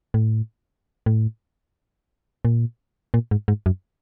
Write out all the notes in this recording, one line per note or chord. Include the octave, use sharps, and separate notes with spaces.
A2
A2
A#2
A#2
G#2
G#2
F#2